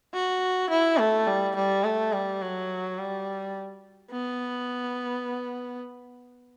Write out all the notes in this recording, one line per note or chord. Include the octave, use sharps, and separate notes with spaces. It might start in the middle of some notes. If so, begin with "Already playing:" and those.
F#4
E4
A3
G3
G3
A3
G3
F#3
G3
B3